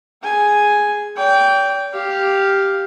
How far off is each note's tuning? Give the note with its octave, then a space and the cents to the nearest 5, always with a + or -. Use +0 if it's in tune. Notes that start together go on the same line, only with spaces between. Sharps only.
G#4 +0 G#5 +0
D5 -45 G5 +0
G4 +0 F5 +0